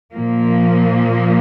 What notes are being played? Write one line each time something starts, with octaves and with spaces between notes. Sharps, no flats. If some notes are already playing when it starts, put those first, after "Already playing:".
A#2 F3 A#3